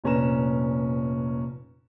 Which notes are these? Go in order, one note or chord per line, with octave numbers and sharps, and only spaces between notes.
F1 A#2 C#4 B4 A#5 E7